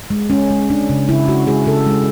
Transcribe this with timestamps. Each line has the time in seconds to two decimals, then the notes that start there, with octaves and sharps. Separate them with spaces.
0.10 G#3
0.30 G#3 C#4
0.50 G#3
0.70 G#3 D4
0.90 C#3
1.08 C#3 E4
1.28 G#3 F#4
1.47 G#3 G#4
1.67 C#3 A4
1.86 G#3